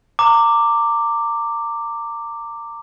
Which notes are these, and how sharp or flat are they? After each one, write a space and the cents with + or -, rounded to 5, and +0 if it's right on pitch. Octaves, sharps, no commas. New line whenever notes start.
A#5 -30 D6 +0